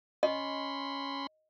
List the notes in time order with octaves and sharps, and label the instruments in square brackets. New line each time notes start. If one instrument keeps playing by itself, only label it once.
[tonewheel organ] C#4 B5 C6 [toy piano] D#5